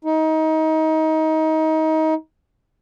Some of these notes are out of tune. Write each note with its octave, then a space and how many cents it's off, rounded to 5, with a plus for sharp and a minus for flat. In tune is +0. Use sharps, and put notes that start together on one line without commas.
D#4 +25